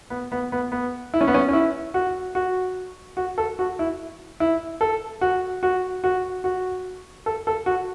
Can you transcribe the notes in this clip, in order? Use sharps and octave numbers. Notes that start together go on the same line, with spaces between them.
B3
B3
B3
B3
E4
C#4
B3
C#4
C#4
E4
F#4
F#4
F#4
A4
F#4
E4
E4
A4
F#4
F#4
F#4
F#4
A4
A4
F#4